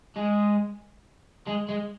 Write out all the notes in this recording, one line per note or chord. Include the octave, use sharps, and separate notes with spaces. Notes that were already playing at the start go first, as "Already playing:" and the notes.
G#3
G#3
G#3